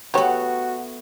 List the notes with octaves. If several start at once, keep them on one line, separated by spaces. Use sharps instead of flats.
A3 B3 F#4 G4 C#5